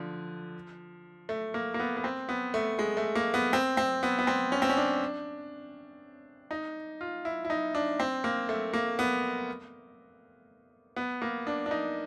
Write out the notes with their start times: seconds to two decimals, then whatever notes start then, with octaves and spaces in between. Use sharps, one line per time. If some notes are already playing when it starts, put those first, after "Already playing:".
Already playing: D3 F3
1.29 A3
1.54 A#3
1.74 A#3
1.79 B3
1.97 B3
2.04 C4
2.29 B3
2.54 A3
2.79 G#3
2.97 A3
3.15 A#3
3.34 B3
3.53 C4
3.77 C4
4.03 B3
4.19 B3
4.27 C4
4.52 C#4
4.62 C4
4.69 C#4
4.77 D4
6.51 D#4
7.01 F4
7.25 E4
7.45 E4
7.50 D#4
7.75 D4
8.00 C4
8.24 A#3
8.49 A3
8.74 A#3
8.99 B3
10.96 B3
11.22 A#3
11.47 D4
11.66 D4
11.71 D#4